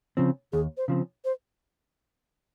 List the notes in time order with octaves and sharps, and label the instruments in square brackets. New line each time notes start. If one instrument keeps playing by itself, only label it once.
[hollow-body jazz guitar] C#3 F3 C4
[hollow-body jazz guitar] D#2 [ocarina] G#4
[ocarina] C5
[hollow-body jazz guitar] C#3 F3 C4
[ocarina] C5